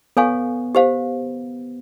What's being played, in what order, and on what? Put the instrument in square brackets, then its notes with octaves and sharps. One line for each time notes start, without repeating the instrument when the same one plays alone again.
[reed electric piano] B3 [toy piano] A4 C#5 F5 G#5 C#6
[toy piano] G4 C5 F5